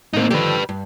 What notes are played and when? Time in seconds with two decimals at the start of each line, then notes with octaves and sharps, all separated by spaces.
0.14 A2 A#3 C4 D#4
0.31 D3 D#3 F3 G4 B4
0.69 G2